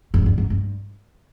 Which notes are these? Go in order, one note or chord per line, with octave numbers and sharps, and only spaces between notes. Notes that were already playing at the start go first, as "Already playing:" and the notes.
G2
G#2
G2
G#2
G2